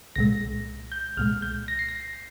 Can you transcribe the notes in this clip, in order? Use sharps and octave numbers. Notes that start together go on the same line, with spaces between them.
C2 A#2 G#3 A#6
G6
C2 A#2 G#3 F6
G6
A#6
C7
A#6